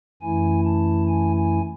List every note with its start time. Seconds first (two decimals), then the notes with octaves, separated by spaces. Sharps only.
0.22 F#2 E3 A3 E4 G#5
0.65 A5
1.08 G#5
1.36 G#5